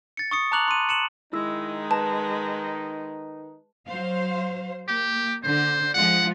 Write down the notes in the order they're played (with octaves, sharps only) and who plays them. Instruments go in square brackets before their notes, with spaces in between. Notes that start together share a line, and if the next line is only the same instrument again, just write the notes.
[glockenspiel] A6 C#7
C#6 D#6 C#7
A5 A#5 D6 F#6 F7 F#7
C6 D#7
C#7 E7 F#7
[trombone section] D#3 D#4 [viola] G#3 [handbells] E4 E6
[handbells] B4 [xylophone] A5
[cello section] F#3 C5 F5
[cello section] A#3 [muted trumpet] G4
[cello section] D3 [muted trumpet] C5
[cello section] F3 G#3 F4 [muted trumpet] F#5